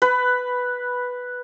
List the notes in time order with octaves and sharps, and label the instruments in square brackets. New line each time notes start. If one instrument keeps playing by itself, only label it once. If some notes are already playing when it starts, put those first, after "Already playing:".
[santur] B4